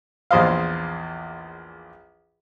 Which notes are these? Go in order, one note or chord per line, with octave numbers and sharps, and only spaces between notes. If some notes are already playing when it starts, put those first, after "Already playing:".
A#1 E2 C5 D#5 F5